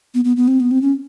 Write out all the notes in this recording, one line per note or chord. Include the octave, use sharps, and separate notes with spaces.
B3
B3
B3
C4
B3
C4
C#4